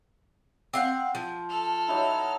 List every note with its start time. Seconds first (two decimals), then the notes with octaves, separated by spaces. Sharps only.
0.73 C4 F5 F#5
1.15 F3
1.50 A4 F6
1.88 F#3 D#4 E4